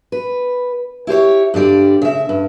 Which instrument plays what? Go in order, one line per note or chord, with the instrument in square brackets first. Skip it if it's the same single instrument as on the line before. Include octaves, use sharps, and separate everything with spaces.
[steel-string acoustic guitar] B4
E4 G4 C5 C#5
G2 D3 G3 D5
C#3 E5
G2